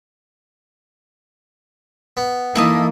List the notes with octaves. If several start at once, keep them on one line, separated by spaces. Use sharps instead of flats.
B3
E3 A#3 D#4 E4 A4 D#5